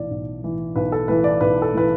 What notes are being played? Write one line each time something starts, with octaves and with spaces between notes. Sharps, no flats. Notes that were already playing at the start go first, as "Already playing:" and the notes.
Already playing: B1 A2 E3 D5
B1
A2 E3
B1 B4
A4
A2 E3 B4
D5
B1 B4
A4
A2 E3 B4